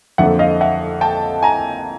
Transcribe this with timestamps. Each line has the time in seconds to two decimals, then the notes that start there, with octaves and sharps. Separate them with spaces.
0.18 F2 D3 F3 A#3 E5 F#5
0.39 D#5 F5
0.61 E5 F#5
1.01 G5 A5
1.43 G#5 A#5